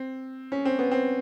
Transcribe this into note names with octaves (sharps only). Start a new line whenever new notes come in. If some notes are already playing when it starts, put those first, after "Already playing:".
Already playing: C4
C#4
C4
B3
C4